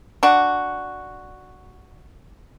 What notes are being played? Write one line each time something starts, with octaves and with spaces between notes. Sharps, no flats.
D4 F#4